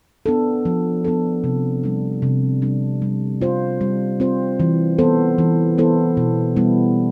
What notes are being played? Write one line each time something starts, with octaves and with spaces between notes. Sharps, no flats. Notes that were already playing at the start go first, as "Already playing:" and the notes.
B3 D4 A4
F3
B3 D4 A4
C3
G3 D4
C3
G3 D4
G3
C4 F4 C5
G3
C4 F4 C5
E3
B3 E4 A4 C5
E3
B3 E4 A4 C5
B2
G3 B3 E4